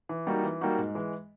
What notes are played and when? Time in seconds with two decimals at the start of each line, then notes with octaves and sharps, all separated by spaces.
0.09 E3
0.27 G3 A#3 D#4 F#4
0.44 E3
0.61 G3 A#3 D#4 F#4
0.78 G#2
0.95 E3 G#3